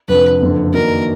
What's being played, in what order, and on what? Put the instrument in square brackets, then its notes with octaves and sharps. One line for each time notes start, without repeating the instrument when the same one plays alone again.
[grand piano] F1 F2 D3 [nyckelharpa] B4
[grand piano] F#1 F2 D3
[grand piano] F#2 D#3 F#3 A#3 D4 [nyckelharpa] A#4